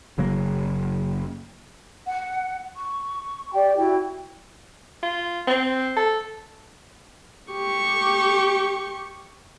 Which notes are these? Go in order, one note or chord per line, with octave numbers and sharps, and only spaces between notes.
F#1 C#3 F#3 A#3
F#5
C#6
G4 D5 G5
E4 F#4 G5
F4
C4
A4
G4 C#6